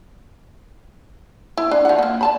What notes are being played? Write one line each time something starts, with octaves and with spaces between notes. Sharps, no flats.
E4
D4
F3 F#5
A#3 B3
D5 A5 B5